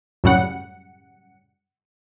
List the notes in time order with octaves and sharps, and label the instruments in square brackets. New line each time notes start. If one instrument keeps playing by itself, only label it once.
[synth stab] F#2 A2 C#3 G3 F#5 C#7